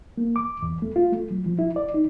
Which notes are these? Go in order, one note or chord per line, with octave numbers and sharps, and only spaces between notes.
A#3
D6
E2
A3
F4
A3
F#3
F3
E4
D5
D#4